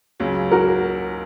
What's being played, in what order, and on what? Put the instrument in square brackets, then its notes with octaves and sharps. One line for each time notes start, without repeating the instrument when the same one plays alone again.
[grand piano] C#2 C#3 F#3
[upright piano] F#4 A#4